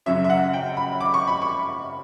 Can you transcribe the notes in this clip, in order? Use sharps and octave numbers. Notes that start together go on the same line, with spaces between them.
F#2 C#3 F#3 C#4 E5
E5
F#5
G5
B5
D6
C#6
B5
C#6